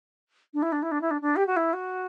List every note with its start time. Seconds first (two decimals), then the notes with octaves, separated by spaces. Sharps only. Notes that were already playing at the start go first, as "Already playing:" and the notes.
0.54 D4
0.62 E4
0.72 D4
0.82 E4
0.91 D4
1.01 E4
1.11 D4
1.21 D4
1.36 G4
1.47 F#4
1.56 E4
1.73 F#4